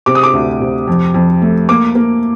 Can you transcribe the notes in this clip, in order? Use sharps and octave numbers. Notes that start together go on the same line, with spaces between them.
C3 D6
D#6
D6
D2
C3
F2
F2
A3
A#3 D6
A#3